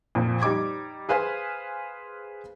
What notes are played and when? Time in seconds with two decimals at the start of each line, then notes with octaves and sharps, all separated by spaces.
0.15 F2 A#2
0.42 G3 D#4 D6 G#6
1.09 G#4 B4 C5 F5 G#5